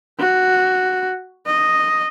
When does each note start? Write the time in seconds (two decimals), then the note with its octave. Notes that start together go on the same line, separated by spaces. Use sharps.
0.19 F#4
1.47 D#5